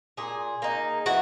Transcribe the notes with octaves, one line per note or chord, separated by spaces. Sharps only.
A#2 G#4
A#3 D#4
E3 F#4